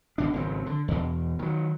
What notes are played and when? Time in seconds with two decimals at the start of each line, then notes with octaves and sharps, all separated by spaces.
0.18 B1 B2 D4
0.34 G#1 C#3 F#3 C4
0.66 D3
0.88 E2 B2
1.39 D#3 F#3